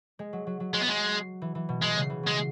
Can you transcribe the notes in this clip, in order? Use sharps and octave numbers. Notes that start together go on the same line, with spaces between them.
G#3
F#3
F#3
F#3
F#3 G#3
B3
G#3
E3
E3
B2
B2 G#3
C#3
E3
F#3 G#3